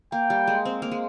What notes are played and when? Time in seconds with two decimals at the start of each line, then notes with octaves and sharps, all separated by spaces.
0.12 A#3 G5
0.30 G3
0.47 G#3
0.65 C4
0.82 A#3
0.92 G#3